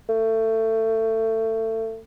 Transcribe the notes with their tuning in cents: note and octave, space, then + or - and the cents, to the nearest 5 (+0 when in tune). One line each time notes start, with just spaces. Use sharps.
A3 +25